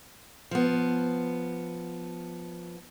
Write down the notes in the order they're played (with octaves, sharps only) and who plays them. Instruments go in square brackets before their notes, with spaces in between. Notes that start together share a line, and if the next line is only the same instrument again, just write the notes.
[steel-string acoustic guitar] F3 B3